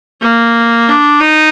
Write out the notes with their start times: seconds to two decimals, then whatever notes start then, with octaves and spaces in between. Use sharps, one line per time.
0.21 A#3
0.88 D4
1.21 D#4